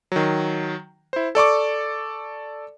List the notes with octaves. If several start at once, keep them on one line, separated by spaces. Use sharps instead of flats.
D#3 F#3
E4 C5
A4 D5 C#6 D6